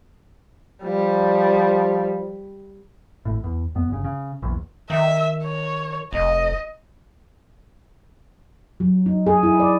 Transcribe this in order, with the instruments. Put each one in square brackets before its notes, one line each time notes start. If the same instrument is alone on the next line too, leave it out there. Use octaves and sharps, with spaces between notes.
[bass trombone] F3 [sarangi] G3
[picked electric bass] G#1 A2
E2
F2 B3
G1 C#3
C#3
A#1 E2
[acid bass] D#3 [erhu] E5
[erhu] C#5
[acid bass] F1 [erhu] D#5
[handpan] F#3
D#4
G#4
E4
D5